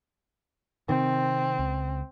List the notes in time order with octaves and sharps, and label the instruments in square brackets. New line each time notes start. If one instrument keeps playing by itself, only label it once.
[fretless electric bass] C3 D#3 [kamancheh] C4
[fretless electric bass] C#2